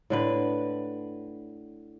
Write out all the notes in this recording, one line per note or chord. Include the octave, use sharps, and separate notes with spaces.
A2 D3 B4